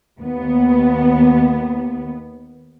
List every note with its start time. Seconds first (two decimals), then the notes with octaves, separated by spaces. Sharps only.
0.21 D#2 B3